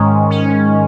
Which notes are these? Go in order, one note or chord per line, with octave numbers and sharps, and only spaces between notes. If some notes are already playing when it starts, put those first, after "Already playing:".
Already playing: G#2 D#3 G#3 C#4
C#4